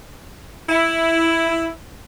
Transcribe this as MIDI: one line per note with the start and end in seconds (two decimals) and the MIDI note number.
0.69 1.70 64